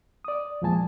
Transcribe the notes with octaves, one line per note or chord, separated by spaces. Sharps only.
D5 D#6
E2 A#2 F3 G#3 G#5 A5